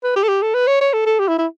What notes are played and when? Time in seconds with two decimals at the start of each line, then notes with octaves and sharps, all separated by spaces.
0.04 B4
0.16 G4
0.23 A4
0.28 G4
0.42 A4
0.54 B4
0.67 C#5
0.81 C#5
0.93 A4
1.06 A4
1.19 G4
1.28 E4
1.38 E4